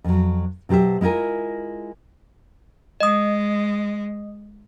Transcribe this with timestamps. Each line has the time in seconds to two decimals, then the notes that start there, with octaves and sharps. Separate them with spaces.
0.04 F2 F#3
0.69 B2 F#3 G4 C5 E5
1.01 G#3 E4 F4 A#4 G#5
3.01 G#3 D#5 D#6